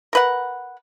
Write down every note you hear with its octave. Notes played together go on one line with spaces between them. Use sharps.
A#4 B4 F#5